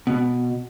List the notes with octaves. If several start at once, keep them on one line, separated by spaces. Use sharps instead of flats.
B2